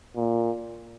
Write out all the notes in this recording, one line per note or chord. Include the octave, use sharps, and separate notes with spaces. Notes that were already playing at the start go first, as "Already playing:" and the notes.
A#2